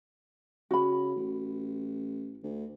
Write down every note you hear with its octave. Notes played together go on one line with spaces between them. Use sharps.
C#3 F#4 B5
A1
D2